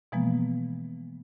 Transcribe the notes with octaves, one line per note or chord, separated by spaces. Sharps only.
B2 E3 F3 G#3 A#3 B3